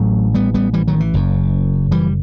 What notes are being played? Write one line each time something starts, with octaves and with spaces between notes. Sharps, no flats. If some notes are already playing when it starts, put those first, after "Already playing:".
Already playing: A1 A2 F#3 A3
G3 B3
G3 B3
E3 G3
D#3 F#3
E3
F#1 F#2
E3 G3